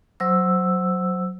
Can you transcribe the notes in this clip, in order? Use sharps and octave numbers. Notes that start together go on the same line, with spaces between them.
F#3 C5 E6